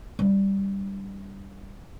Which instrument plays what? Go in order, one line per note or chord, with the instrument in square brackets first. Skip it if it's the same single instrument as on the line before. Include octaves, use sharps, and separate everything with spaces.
[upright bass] G3 D4